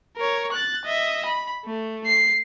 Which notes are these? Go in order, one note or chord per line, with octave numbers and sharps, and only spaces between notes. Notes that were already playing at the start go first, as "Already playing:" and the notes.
A#4 C#5
F#6 A6
D#5 E5
B5
A3
C7